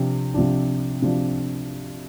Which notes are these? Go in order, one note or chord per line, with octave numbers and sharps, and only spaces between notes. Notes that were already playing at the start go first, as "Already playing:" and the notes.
Already playing: C3 F3 D4
C3 F3 D4
C3 F3 D4